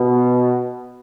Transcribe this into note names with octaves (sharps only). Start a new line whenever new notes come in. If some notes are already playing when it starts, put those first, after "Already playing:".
Already playing: B2